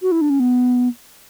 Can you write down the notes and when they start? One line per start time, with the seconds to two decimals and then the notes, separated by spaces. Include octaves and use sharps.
0.02 F#4
0.11 E4
0.21 D4
0.30 C#4
0.40 B3